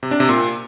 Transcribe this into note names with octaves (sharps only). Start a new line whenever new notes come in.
C3
D4
C3
A#2